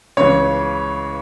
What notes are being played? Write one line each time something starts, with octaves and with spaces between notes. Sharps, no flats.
C#2 C#3 E3 C#5